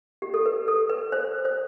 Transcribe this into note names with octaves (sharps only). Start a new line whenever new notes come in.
G4
A4
B4
A4
B4
C5
C5